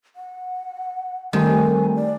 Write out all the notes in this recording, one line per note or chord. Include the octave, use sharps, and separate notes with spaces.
F#5
D#3 G3 A3 C4 G#5
D5